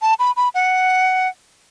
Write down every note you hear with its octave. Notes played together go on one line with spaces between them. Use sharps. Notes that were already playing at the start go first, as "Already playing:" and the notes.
A5
B5
B5
F#5